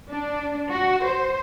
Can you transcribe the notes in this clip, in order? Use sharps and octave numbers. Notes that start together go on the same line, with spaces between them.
D4
F#4
C5